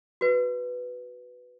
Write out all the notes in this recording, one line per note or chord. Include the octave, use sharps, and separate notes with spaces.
F#4 B4